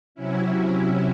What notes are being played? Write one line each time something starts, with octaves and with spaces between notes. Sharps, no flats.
C3 F#3 C#4 E4